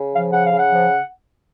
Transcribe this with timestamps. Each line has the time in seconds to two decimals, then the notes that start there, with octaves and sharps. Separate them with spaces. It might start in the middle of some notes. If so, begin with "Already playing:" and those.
Already playing: C#3
0.12 F3 F5
0.31 C#3 F#5
0.44 F5
0.50 C#3
0.57 F#5
0.69 F3